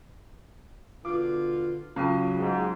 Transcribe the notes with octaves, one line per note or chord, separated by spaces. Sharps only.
B2 D3 F4 D6
C#3 F#3 C#4 F4 G5
G#2